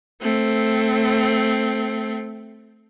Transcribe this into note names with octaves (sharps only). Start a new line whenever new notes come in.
A3 C4